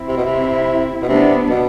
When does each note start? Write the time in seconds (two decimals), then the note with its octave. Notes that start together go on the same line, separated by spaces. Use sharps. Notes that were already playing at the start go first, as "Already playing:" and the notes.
Already playing: C4 E4
0.08 C3
0.17 B2
0.26 C3
1.02 B2
1.09 C3 B3 D4
1.49 B2